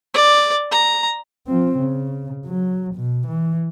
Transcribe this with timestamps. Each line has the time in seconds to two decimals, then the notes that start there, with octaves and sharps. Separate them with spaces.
0.14 D5
0.71 A#5
1.47 F3 C4
1.78 C#3
2.46 F#3
2.95 B2
3.28 E3